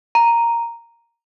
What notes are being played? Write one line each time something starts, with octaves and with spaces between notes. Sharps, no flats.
A#5